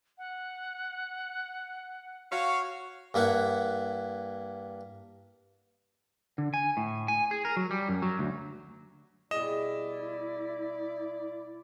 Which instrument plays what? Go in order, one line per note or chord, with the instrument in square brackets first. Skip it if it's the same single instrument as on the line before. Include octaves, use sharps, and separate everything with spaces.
[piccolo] F#5
[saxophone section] F#4 C#5 F5
[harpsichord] G2 A#3 E4 F#5
[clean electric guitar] D3
G#5
A2
G#5
G#4
A#4
F#3
G3
F#2
F#3
D2
[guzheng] B2 G3 G#4 [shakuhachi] E4 [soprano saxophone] D5 [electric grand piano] D#5 E7